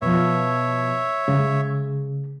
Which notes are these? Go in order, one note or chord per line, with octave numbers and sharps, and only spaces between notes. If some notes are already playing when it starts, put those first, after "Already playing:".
B2 F3 C#5 E5
C#3 G#3